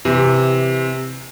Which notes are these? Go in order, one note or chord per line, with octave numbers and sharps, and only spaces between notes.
C3 E3